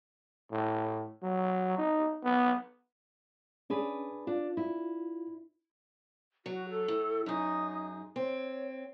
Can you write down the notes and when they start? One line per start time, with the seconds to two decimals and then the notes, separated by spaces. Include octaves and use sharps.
0.52 A2
1.23 F#3
1.78 D#4
2.24 B3
3.70 C#4 D4 G#4 B4
4.27 D4 F4
4.57 E4
6.46 F#3 F#4
6.70 A4
6.88 A2
7.26 F#2 D#4 G#4
8.16 C4 C#5